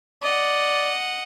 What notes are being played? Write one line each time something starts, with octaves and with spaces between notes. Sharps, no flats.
D5 D#5 F#5